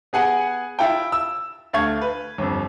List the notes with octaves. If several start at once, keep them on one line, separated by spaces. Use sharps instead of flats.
B3 G#4 F#5 G#5
E4 F4 G5
E6
D2 A3 F5 C#6 G6 G#6
B4
G1 F2